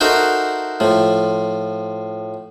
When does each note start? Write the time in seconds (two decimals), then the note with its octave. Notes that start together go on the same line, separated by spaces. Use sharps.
0.01 D#4 F#4 A4 A#4 C5 E5
0.80 A2 F3